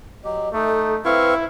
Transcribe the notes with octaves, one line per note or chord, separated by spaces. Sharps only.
F#3 G4 D#5
A3 D#4 A4
C4 E4 B4 F5 C#6